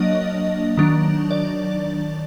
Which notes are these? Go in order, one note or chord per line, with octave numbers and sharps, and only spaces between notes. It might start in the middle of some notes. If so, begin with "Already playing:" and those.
Already playing: F#3 A#3 D4 D#5
D#3 F#3 D4
D5